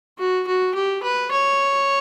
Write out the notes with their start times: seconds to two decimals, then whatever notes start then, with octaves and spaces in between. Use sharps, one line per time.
0.19 F#4
0.47 F#4
0.75 G4
1.03 B4
1.31 C#5